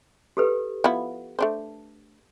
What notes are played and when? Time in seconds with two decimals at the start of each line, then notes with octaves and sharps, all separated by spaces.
0.37 G4 A4 B4
0.84 F3 B3 E4
1.39 A3 D4 C5